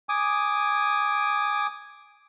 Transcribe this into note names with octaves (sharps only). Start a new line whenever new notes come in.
G#5 D6 D#6